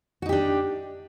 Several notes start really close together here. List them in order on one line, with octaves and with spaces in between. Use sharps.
F#4 D#4 G4 D4